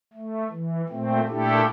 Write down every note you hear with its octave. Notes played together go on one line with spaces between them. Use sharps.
A3
E3
A#2 A3 C4
A#2 A3 D4 E4 G4 A4